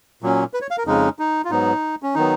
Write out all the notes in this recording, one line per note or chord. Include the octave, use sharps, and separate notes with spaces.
A#2 F#3 C#4
B4
C#5
F5
A#4
F2 C#3 G#3 C#4 D#4
D#4
F4
G#2 F#3 B3 D#4
C#4
D#3 F#3 B3 D#4